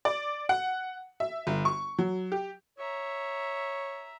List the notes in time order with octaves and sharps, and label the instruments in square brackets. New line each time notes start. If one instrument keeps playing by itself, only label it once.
[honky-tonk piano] D5
F#5
E5
G1
C#6
F#3
G4
[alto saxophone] C#5 [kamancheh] E5 A#5